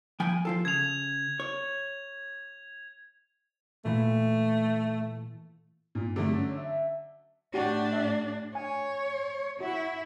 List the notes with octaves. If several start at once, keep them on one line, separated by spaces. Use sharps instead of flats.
F3 G5 G#5
F3 F4 A4
C#3 G#6 F7
C#5
A#2 E3 A3 B4
G2 A#2
D3 F#3 A3
C#4
E5
A2 D4 F#4 G4
E5
C#5 G#5
E4 F#4